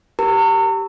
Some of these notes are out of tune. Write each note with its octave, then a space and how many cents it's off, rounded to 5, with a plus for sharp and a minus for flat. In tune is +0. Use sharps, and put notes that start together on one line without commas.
G4 +0 A#4 +0 A#5 -40